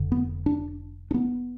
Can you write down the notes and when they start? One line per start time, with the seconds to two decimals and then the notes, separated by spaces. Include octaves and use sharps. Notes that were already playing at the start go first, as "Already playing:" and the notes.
Already playing: F1 F2 D3
0.12 B3
0.46 D4
1.11 D4
1.14 B3